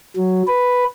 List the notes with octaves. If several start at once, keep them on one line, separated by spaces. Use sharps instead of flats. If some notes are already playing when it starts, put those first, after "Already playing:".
F#3
B4